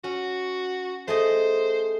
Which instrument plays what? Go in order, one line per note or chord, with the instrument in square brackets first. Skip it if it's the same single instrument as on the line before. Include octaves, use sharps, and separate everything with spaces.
[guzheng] C#4 [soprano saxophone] F#4
[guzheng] A3 G#4 D#5 [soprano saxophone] C5